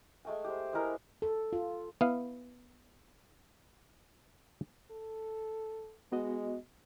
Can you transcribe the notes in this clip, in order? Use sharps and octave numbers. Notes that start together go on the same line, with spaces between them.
G#3 A3 G5 G#5
G4 C5
G#3 E4 G#4 A#4
A4
F4
B3 E4 F5
A4
G#3 B3 F#4 D#5